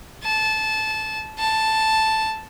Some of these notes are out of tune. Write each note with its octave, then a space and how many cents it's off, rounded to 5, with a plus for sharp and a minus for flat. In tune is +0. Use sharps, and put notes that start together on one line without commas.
A5 -20
A5 +0